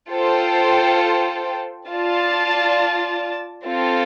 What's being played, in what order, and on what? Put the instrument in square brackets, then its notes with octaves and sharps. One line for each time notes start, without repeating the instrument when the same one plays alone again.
[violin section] F4 A4 C5 G5
F4 D5 A5
C4 F4 A4